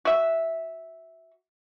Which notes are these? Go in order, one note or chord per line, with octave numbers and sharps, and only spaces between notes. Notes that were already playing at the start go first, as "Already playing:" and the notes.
F#4 E5